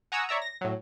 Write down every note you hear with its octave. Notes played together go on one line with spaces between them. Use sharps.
F#5 G#5 A#5 C#6 D#6 E6
C#5 D5 E5 A#5
A#6
A2 F#3